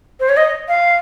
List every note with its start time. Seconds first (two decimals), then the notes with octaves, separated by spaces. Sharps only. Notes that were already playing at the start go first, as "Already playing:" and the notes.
0.20 C5
0.29 C#5
0.37 D#5
0.68 F5